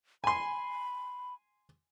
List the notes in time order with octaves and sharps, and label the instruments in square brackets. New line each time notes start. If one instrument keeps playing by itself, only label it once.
[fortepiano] G#5 C6 [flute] B5